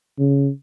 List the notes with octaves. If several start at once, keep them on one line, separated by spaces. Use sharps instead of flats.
C#3